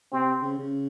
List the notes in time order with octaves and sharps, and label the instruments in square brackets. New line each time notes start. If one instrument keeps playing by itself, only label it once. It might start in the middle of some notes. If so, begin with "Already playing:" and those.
[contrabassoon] C3 [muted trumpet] C4
[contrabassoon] C#3
C#3